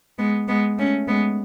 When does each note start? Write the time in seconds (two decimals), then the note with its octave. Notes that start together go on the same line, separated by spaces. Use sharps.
0.18 G#3 B3
0.48 G#3 B3
0.78 A3 C#4
1.08 G#3 B3